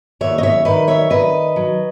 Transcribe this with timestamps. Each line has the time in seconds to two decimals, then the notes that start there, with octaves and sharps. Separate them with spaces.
0.21 D#2 C#5 E5
0.38 D#5
0.43 C#5 E5
0.65 D#3 B4 D#5
0.88 C#5 E5
1.10 D#3 B4 D#5
1.56 F#3